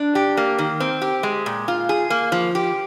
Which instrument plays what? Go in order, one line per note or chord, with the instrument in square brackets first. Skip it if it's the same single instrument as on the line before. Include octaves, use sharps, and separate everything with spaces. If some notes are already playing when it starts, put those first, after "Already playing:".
Already playing: [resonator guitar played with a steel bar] D4
G4
A#3
D#3
C4
G4
G#3
A#2
F4
G#4
A#3
F3
G4